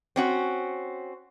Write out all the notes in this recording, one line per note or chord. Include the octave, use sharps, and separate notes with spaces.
C4 C#4 F#4